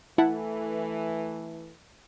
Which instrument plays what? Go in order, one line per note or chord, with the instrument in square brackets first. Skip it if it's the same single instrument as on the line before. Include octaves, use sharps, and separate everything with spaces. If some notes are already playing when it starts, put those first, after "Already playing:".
[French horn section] E3 A3 [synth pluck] E4 F#5 A5